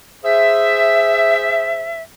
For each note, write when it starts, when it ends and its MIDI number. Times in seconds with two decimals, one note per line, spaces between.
0.24 2.02 68
0.24 2.02 72
0.24 2.02 76